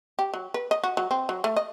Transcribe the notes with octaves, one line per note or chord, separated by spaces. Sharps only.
G4
F#3
B4
D#5
F#4
F#3
C4
F#3
A3
D#5